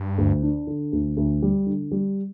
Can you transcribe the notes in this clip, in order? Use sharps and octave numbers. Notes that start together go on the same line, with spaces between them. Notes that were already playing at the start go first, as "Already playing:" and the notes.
Already playing: G2
D2
D4
D3
D2
D2
G3
D3
G3